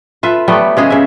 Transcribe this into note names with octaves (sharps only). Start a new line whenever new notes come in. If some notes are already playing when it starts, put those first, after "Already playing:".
F4 A4 B4 E5
F#3 G3 A3 B3
C#3 G#3 G#4
C#3 E5